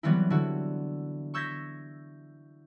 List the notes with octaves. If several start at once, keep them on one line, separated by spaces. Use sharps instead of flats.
E3 F#3 G3 B3 C4 E4
D3 E4 F#4
C#6 E6 G6 G#6 A#6 B6